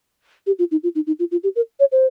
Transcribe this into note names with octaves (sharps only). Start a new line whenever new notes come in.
G4
F4
D#4
F4
D#4
D#4
F4
F4
G4
A#4
C#5
C5